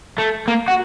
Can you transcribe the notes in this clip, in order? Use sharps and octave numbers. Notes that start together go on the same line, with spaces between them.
A3
A#3
F#4